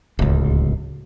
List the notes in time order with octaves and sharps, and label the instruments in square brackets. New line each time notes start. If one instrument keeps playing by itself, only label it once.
[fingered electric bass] D1 C#2